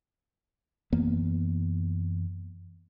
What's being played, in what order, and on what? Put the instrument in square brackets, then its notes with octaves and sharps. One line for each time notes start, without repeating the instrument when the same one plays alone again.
[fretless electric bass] F#2 E3 A#3 B3